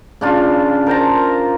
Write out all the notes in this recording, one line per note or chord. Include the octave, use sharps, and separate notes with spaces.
C#3 D4 F4
A#4 C5 A5 A#5